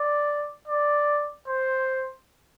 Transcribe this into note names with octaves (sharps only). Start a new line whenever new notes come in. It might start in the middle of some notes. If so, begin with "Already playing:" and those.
Already playing: D5
D5
C5